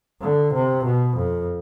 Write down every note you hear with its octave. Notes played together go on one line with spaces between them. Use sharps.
D3
C3
B2
F2